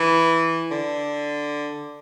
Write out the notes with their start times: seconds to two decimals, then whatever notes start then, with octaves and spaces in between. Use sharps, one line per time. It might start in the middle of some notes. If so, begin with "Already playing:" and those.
Already playing: E3
0.71 D3